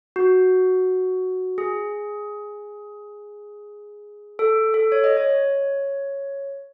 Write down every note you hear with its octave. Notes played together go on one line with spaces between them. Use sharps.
F#4
G#4
A4
A4
C#5
D#5
C#5